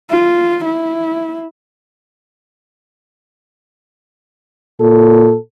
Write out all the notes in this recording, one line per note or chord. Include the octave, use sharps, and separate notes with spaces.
F4
E4
A#2 A4